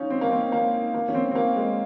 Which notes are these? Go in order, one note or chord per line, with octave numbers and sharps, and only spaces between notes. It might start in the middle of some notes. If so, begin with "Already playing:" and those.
Already playing: C#4 D#4 F4
C4
A#3
C4
A#3
A#3
C#4
C4
C4
A#3
G#3